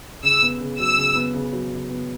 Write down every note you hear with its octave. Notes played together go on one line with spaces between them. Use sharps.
C#3 E6
B3
C#3
F#3 E6
C#3
B3
C#3
F#3
C#3
B3